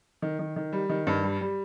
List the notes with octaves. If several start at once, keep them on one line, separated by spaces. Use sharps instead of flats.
D#3
D#3
D#3
G3
D#3
G2
G3
G3